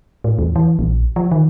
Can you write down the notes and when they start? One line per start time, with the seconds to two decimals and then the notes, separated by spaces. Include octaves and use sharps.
0.24 A2
0.39 E2
0.56 E3
0.79 A#1
1.16 F3
1.31 D#3